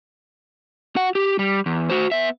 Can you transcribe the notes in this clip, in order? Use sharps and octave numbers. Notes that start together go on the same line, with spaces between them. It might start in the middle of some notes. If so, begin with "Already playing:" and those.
F#4 F#5
G4
G3
E2
F#4 C5
B3 E5